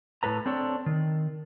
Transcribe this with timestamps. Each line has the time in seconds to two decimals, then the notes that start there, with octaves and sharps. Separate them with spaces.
0.23 A2 A4 B4 A#5
0.46 C4 D4 A4 C#5
0.86 D#3